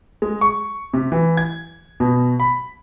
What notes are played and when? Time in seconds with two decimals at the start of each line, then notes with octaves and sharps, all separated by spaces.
0.22 G#3
0.41 C#6
0.94 C3
1.12 E3
1.37 G#6
2.00 B2
2.40 B5